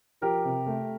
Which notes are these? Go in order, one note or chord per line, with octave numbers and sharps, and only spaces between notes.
F3 G4 A#4
C3
A3